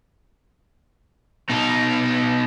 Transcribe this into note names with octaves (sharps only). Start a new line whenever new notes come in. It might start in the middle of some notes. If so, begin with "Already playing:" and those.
B2 D#4